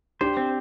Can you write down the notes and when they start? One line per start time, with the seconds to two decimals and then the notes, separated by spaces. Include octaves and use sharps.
0.21 D4 G4 C5
0.37 C4